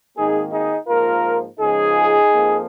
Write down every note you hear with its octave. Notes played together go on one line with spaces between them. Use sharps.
G#1 G#2 D#3 A#3 D#4 G#4
D#4 G#4
G#2 F3 A#3 F4 A#4
C#2 C#3 F3 G#3 D#4 G#4
F2 F3 A#3